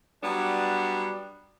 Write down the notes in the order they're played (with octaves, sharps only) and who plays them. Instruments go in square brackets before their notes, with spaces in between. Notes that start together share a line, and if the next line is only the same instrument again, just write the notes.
[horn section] F#3 G3 B3 D4